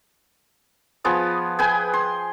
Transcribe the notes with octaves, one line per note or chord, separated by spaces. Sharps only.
F3 B3 G#4
G#4 B4 G5 G#5
C6